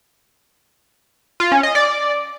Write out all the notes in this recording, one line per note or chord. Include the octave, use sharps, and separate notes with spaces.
F4
C#4
D#5
D5